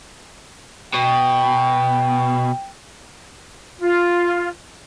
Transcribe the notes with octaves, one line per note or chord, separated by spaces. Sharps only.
B2 G5
F4